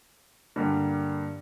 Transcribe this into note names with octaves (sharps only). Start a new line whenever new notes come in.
G2 D3 G3 A#3